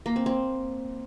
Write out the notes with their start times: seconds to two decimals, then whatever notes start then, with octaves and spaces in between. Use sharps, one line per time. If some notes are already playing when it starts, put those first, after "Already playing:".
0.06 A#3
0.16 C4
0.26 C4